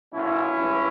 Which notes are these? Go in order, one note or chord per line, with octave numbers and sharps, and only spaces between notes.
B1 A#2 C#4 E4
G#1 G2 E3